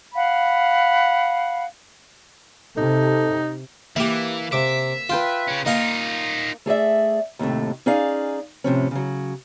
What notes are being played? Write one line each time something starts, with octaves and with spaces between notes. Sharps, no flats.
F5 F#5 B5
C3 D#4 A4
E3 A#3 G4 B4 E5
C3 E5 D6
F4 B4 G5 C6
C#3 C#4
A#3 D#4 F4 D#5 F5 G#5
A3 G#4 D5 E5
D#2 A2 C3 A3
C#4 D#4 G#4 D5 F5
A2 C3 F3 C#4
C#3 F#3